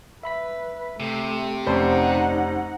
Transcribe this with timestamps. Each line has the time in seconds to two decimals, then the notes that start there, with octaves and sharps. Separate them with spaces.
0.23 B4 E5 B5 B6
1.00 C3 A3
1.67 F1 C#4 D#4 C5 D5 F#5 A5 B5